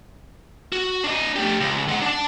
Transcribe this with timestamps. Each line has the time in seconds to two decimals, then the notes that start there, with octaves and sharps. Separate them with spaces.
0.72 F#4
1.04 D4 D#5
1.36 A3 G4
1.61 C#2
1.89 G#3 F#5
2.02 D4 A5